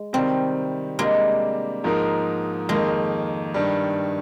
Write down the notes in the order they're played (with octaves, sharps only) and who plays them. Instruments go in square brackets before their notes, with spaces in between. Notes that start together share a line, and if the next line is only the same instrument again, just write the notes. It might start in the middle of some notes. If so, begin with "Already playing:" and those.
Already playing: [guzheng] G#3
[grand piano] C3 D#3 G3 [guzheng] C4
[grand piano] C3 G3 A#3 D4 [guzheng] G#3
[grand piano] G#2 F3 A#3 D#4 A#4
[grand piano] F2 D#3 A#3 [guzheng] G#3
[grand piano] G2 D#3 G3